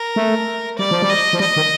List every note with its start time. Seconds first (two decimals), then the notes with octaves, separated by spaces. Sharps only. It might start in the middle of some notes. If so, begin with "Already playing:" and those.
Already playing: A#4
0.16 A3
0.78 G3 D5
0.91 F3
1.02 G3
1.10 D#5
1.33 F3
1.40 G3 D#5
1.56 D#3